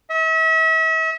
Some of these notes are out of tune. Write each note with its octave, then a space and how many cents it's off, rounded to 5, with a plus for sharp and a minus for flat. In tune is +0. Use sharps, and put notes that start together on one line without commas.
E5 -40